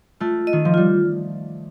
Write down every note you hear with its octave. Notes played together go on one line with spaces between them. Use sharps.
A3 F4
D#5
D#3
F3
G3 F4